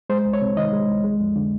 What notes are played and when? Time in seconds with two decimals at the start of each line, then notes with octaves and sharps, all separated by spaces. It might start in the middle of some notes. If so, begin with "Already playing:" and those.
0.10 G#3 C5
0.25 C2
0.33 C#5
0.42 C3
0.57 D#3 D#5
0.73 G#3
0.89 C2
1.04 G#3
1.20 F2
1.36 D3